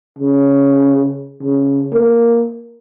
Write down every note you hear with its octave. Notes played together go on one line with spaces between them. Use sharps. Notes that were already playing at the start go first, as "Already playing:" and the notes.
C#3
C#3
A#3